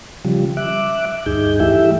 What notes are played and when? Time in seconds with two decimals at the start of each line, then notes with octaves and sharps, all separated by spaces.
0.25 C#3 F3 G3
0.57 E5 D6 F#6
1.26 D2 G2 D#4 G#4 G6
1.60 E3 A3 E4 G4 E5